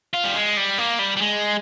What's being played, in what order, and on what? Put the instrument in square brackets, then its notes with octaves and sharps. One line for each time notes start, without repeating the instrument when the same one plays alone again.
[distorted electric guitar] F4
G3
G#3
G3
A#3
G3
G3
G#3